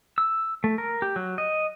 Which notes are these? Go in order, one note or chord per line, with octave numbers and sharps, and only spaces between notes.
E6
A3
A#4
G4
F#3
D#5